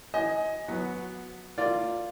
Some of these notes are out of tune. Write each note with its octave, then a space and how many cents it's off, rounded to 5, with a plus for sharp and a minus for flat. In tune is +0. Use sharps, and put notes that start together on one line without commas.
D#5 +20 G#5 +0
F#3 -15 B3 +0
A#3 -30 F4 +0 D5 +0